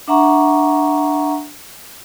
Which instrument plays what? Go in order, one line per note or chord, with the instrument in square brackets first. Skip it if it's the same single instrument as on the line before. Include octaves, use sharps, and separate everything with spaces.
[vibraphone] D4 E5 F#5 A#5 C#6